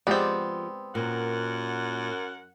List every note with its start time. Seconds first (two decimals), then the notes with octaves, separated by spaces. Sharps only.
0.07 F3 G#3 B3 C4 G4 D5
0.95 F#2 A#2 A#4 F#5